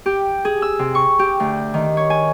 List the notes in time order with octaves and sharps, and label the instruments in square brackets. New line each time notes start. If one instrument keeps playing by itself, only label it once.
[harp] G4
G#4
E6
C3
C#6
G4
D2
D#3
C#5
G#5